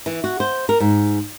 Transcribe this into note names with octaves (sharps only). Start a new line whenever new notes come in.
E3
F#4
C5
A#4
G#2